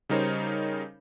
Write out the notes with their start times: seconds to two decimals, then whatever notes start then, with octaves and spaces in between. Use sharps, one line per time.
0.09 C#3 G3 D#4 A#4 C5 C#5